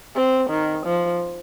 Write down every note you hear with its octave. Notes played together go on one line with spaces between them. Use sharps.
C4
D#3
F3